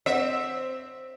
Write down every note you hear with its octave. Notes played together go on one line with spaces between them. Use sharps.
C4 C#5 D#5 E5 F#5